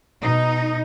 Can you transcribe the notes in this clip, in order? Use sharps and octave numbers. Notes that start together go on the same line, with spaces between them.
B2 D#4